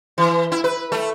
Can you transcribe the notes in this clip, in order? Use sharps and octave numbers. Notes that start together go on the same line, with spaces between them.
E3
E4
B4
A3